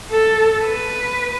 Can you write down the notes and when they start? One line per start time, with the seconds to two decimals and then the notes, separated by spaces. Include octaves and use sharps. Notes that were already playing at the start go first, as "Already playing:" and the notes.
0.11 A4
0.65 B4